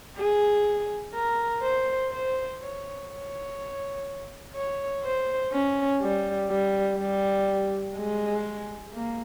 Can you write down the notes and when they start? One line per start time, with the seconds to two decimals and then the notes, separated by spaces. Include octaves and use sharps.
0.17 G#4
1.14 A#4
1.63 C5
2.12 C5
2.60 C#5
3.09 C#5
4.55 C#5
5.04 C5
5.52 C#4
6.01 G3
6.50 G3
6.99 G3
7.96 G#3
8.94 A#3